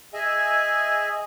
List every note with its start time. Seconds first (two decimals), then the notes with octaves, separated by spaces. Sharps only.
0.14 G#4 D#5 E5 G#5